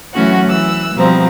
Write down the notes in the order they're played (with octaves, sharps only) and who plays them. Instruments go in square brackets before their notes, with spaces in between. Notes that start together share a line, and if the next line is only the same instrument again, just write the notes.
[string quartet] E3 F#3 A3 C#4 F#4 F#5
E3 E6 F#6
B2 F3 G3 B3 C4 A#5